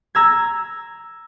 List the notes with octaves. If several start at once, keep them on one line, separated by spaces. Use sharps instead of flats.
A#5 E6 G#6